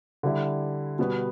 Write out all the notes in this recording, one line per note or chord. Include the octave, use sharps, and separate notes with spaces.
D3 G3 E4
B2 G3 B3